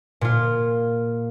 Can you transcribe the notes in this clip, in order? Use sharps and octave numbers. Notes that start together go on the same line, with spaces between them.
A#2 F4